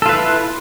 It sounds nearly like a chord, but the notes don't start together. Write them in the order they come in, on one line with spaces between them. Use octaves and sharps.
A4 F4 B4 E4